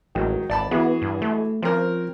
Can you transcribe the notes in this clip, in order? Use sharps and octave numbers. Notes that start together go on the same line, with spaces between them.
A1 D#3 F#3 G#3
G#1 D5 A5 B5
E3 B3 F#4 G#4
G2
A3
F3 C4 C#4 A#4